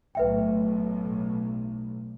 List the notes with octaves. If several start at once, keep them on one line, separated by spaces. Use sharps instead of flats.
B1 A2 B4 E5 G5